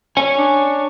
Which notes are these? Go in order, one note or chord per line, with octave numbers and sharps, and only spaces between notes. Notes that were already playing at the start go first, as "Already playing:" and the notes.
C#5 G#5
D4